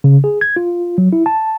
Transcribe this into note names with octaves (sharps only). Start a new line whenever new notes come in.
C#3
G#4
G#6
F4
F#3
E4
A5